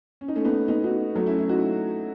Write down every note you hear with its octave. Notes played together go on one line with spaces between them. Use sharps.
C#4
D#4
A3 C#4
B3 D#4
B3 D#4
D#4 F#4
F#3 A3
C#4 E4
C#4 E4
D#4 F#4